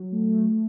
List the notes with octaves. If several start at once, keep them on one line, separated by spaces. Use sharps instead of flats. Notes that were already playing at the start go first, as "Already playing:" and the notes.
Already playing: F#3
A3